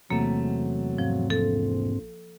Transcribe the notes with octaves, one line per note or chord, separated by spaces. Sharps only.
E2 C3 F#3 A3 A#3
G#2 F3 C4
A#1 A4